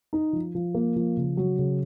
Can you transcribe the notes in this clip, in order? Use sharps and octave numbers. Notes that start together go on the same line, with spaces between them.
D#4
F3
F3
A#3
F3
C#3
F#3
C#3